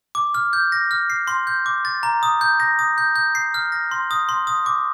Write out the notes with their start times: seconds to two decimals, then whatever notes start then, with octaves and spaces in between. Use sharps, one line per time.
0.15 D6
0.34 F6
0.53 G6
0.72 A#6
0.91 F6
1.10 C7
1.27 C6
1.47 G6
1.66 D6
1.85 A6
2.03 A#5
2.23 D#6
2.41 G6
2.60 A#6
2.79 D#6
2.98 G6
3.16 G6
3.35 C7
3.54 F6
3.72 A#6
3.91 C6
4.11 D#6
4.29 C6
4.47 D#6
4.66 D6